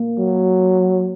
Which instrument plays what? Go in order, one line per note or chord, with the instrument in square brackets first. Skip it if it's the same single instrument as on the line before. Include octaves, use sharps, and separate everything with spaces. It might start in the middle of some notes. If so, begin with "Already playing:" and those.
Already playing: [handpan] A#3
[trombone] F#3